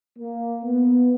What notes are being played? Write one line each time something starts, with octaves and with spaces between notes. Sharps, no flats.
A#3
B3